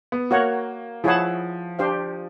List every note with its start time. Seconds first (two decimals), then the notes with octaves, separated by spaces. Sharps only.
0.12 B3
0.31 A#3 F#4 A#4 C#5 F#5
1.04 F3 E4 G#4 C#5 F#5 A5
1.79 D4 G4 C5 F5